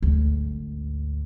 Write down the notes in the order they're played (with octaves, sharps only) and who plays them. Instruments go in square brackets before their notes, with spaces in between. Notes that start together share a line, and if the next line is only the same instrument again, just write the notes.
[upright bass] G#1 D2